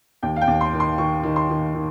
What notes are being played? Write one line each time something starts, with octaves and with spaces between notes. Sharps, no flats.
D#2 G5
F5
G5
D#2
C6
D#3
C6
D#3 C#6
D#3
C6
D#3
D#3